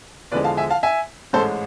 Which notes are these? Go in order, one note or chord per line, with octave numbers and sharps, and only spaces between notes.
E2 D3 F3 G#3 B4 D5
F5 A5
E5 G#5
F5 A5
E5 G#5
A1 G#2 G#3 A4 C5